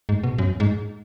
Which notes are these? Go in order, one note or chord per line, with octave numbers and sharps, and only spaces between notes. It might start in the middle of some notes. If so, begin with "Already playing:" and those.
G#2
B2
F#2
G#2